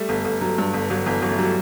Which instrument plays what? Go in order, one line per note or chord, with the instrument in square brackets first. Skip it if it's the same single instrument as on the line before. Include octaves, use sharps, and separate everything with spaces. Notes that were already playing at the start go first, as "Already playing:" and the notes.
Already playing: [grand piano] G3 A3
[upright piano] G1
G1
F#3
G2
G1
[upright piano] G1 [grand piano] F#3
[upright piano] G1 [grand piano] E3
[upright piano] G1 [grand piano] F#3
[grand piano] A3
[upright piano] F#3 [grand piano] G3